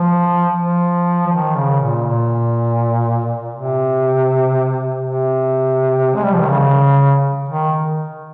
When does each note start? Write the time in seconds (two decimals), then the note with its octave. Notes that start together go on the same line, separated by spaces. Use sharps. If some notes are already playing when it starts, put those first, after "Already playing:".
Already playing: F3
0.57 F3
1.26 F3
1.32 D#3
1.56 C#3
1.81 A#2
2.06 A#2
3.54 C3
5.02 C3
6.15 G#3
6.23 G3
6.32 F3
6.42 D#3
6.49 C#3
7.49 D#3